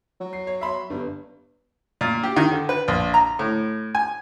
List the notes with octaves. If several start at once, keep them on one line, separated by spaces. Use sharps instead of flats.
F#3
C7
C#5
E5 B5 C6
G1 G2
A#2
G4
D#3
D3
B4
A#1
A#5
A2
G#5